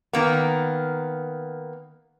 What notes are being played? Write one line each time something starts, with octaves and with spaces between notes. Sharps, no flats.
D#3 A#3 B3